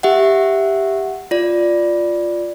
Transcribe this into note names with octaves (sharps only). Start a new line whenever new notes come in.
G4 E5 F#5
F4 D5